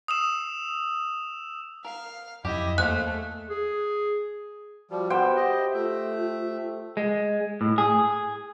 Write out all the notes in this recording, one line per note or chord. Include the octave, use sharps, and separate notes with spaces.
D#6 E6 E7
A#4 F5
F2 F#3 E4 G4 D#5
E2 A3 A#3 G#4 C5 F5 F#6
G#4
F3 G3 F#4
B3 G4 C5 G5
D#5
E5
A3 F4 E5
G#3
A2
G#4